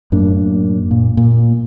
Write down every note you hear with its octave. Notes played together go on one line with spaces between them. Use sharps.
F#2 A2 A#3 D4
A#2
A#2